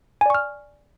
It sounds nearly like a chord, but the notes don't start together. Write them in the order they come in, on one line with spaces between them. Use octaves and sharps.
G#5 D5 C#6 F6